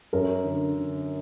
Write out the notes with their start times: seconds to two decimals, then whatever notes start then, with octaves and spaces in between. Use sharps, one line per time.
0.13 F#2 A#4
0.44 D3
0.74 D3